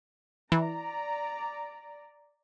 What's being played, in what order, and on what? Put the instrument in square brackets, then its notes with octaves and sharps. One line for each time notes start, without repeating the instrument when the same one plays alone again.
[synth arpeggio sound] E3 [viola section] D5 A#5